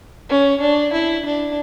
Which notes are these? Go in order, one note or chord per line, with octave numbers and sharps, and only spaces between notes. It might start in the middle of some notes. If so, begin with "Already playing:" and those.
C#4
D4
E4
D4